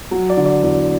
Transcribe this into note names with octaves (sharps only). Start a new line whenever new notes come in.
F#3
D5
D3
D5
E2